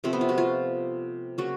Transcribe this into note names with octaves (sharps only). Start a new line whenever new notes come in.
C3 F3 A3 C4
B3
F4
F#4
F4
C#3 F#3 A#3 F#4